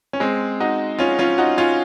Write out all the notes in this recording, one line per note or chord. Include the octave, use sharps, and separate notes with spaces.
C#4
G#3 C4
D#4 F#4
C#4 F4
C#4 F4
D#4 F#4
C#4 F4